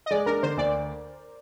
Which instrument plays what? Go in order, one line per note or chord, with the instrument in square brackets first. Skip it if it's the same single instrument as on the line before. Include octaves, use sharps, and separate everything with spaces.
[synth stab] D#5
[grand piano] G#3 [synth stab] D5
[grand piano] D4 [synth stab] A#4
[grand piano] D3 [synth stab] C5
[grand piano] D2 [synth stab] D5